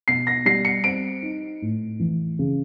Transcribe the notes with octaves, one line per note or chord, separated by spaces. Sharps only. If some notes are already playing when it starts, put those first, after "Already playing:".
B2 C7
A#6
G3 C7
C#7
C4 D7
D#4
A2
E3
C#3